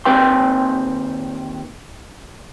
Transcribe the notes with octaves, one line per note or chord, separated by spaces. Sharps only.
D#2 D#3 C4 B4 G5 C6